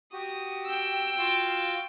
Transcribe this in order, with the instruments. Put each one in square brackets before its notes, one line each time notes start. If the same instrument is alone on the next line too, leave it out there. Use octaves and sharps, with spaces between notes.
[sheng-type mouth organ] F#4 G4 [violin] D#6
[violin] G5 E6
[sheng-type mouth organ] F4 F#4 F5